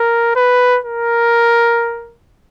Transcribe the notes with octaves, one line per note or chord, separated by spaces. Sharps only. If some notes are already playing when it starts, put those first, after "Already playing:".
Already playing: A#4
B4
A#4